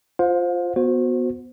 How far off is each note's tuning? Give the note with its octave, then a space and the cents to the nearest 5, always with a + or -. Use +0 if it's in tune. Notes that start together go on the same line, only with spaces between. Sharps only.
F4 +0 C5 +0 F5 +35
B3 +0 F#4 -20 C5 +0